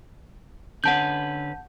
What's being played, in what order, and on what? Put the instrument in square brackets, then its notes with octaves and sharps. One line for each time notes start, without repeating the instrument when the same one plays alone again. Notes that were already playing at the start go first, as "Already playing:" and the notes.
[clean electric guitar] D3 C#4 B4 [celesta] F#5 A5 G6